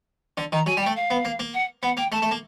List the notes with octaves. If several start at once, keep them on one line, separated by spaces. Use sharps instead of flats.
D3
D#3 A#5
F#3 G#5
G3
A3 G5
F5
B3
A#3
A#3
F#5
B3 F#5
A#3 G5
A3 A5
A3
A#3